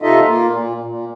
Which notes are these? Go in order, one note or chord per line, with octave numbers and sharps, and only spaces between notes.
C3 D#4 F4 A4 D#5 E5
A#3 F4
A#2
A#2